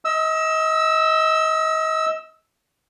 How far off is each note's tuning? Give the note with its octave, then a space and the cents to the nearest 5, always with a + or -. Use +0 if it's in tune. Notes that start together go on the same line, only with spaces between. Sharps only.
D#5 +30 E6 +0